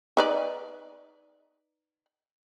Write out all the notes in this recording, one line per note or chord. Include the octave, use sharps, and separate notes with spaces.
D#4 B4 D5